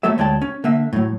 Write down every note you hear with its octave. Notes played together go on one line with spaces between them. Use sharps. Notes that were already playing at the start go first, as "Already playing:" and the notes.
F#3 A3 A#3 A4 E5
D2 G#3 C#5 D5 G5 A5
C#4
D3 A#3 E5
A2 F#3